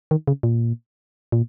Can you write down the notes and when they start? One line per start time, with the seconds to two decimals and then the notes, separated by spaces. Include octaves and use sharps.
0.11 D#3
0.27 C#3
0.43 A#2
1.32 A#2